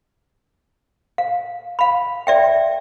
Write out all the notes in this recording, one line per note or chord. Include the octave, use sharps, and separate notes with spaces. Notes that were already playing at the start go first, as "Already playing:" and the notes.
F5
F5 B5
D5 E5 G5